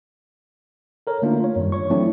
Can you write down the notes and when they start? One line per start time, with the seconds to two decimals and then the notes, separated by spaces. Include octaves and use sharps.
1.07 A4 A#4 C#5
1.22 D3 A3 A#3 D4 D#4 F4
1.40 F4 C#5
1.56 F#2 D#3 G3
1.72 C#5 C#6
1.90 E3 F#3 A3 C4 D4 E4